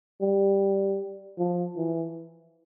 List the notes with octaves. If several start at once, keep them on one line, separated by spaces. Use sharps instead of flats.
G3
F3
E3